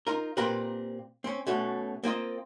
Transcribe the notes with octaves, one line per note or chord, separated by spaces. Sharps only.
D#4 F4 A#4
A#2 C4 G4 A#4 B4
C4 C#4
B2 A3 C#4 F#4
A#3 C4 F4 D#5